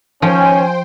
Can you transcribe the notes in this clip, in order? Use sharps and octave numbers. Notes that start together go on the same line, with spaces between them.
D#3 F3 C#4 C5 G5 G#5